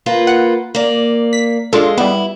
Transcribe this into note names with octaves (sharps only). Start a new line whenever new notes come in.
A#3 F4 B4
F#5
A#3 D5
B6
G#3 D4 F4 A4
G3 B3 E4